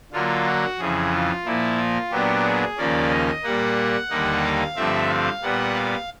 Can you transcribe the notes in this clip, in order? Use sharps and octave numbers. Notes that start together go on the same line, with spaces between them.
D3 F#3 A#3 F4
F#4
F2 C#3 E3 G#4
F4
A#2 F3 A#3 E4
F4
A#2 F#3 B3 D4 G4
G#4
D#2 C#3 F3 A#3 C#4 D5
D#5
A#2 G3 A#3 F#5
D#2 D3 G3 A#3 D#4
F5
G2 D3 F3 A3 C4 E5
F5
A#2 G3 B3 F#5
F5